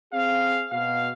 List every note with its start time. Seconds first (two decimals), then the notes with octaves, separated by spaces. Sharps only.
0.13 C4 G#4 F5
0.72 B2 F5